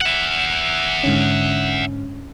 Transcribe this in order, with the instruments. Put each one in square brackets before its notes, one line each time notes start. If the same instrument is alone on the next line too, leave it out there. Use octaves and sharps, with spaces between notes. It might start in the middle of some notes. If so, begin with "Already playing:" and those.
[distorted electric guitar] E5 F#5
[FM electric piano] G#2 D3 C#4